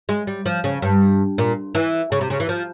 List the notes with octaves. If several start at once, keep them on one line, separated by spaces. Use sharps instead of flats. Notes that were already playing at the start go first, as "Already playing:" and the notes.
G#3
G3
F3
C#3
G2
A#2
E3
C#3
C3
C#3
E3
F3